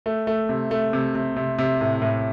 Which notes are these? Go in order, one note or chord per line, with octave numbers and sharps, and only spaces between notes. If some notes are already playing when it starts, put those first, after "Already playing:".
A3
A3
C3
A3
C3
C3
C3
C3
A2
A2